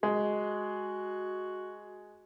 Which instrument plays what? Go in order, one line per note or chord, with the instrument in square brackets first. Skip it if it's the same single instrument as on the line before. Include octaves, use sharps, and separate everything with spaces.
[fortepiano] G#3 [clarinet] F#4